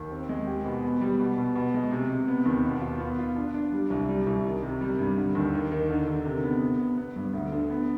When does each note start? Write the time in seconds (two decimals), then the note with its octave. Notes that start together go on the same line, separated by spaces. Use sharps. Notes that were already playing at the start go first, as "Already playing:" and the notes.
Already playing: D#2
0.11 C4
0.29 G#3
0.47 G4
0.66 B2
0.84 B3
1.01 G3
1.19 B2
1.38 B2
1.56 B2
1.74 G#3
1.91 C3
2.10 C3
2.28 B3
2.46 D#2
2.64 B2
2.82 F4
3.00 B3
3.18 F4
3.36 D4
3.54 D4
3.72 G3
3.90 C2
4.09 G3
4.27 C2
4.45 D#3
4.62 C3
4.81 G3
4.99 G2
5.17 D3
5.35 D#2
5.53 D#3
5.71 D#3
5.89 D3
6.07 D3
6.25 C3
6.44 B3
6.61 B3
6.79 B3
6.98 B3
7.16 G2
7.34 D2
7.52 D3
7.70 B3